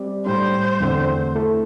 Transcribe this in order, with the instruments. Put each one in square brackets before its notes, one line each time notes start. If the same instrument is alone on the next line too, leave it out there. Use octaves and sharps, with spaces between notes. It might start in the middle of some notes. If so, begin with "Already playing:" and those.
Already playing: [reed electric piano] G3 C4 G4 D5
[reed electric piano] A2 G3 D4 [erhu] C5
[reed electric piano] E2 D3 A3 C4
A3 E4 A4